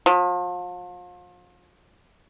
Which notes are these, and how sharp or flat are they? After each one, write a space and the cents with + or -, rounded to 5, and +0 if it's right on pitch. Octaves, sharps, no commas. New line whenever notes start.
F3 +40